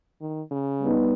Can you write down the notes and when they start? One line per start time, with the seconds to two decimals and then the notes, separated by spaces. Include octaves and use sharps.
0.21 D#3
0.51 C#3
0.81 G3 B3 D#4